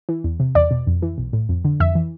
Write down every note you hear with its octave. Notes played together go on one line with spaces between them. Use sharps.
E3
E2
C3
E2 D5
B2
F2
E3
B1
A2
F2
D3
F2 E5
E3